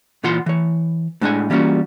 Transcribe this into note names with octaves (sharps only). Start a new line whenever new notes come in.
A#2 E3 F4 F#5 C6
E3 C#5
A2 G#3 D4 F5 F#5 G#5
E3 G3 A#3 C#4 F4 F#4